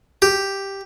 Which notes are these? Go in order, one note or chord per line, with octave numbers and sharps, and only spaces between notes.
G4